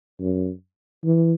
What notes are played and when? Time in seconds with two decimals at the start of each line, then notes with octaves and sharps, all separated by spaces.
0.20 F#2
1.05 E3